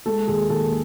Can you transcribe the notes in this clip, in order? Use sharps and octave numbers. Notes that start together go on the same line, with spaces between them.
G#3 A4
D#2 G#4
D#2 A4